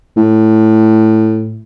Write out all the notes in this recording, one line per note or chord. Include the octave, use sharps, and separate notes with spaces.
A2